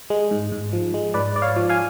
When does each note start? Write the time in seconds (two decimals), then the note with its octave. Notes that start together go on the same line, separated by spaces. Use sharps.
0.10 G#3
0.31 G#2
0.52 G#2
0.73 F3
0.94 G#3
1.14 G#2 B4 D5
1.35 G#2 D5
1.42 C#5 F5
1.56 F3
1.69 F5 G#5